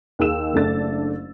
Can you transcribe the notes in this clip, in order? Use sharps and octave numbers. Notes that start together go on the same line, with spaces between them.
D#2 D#3 G#4 E6 E7
F#1 A3 D4 A6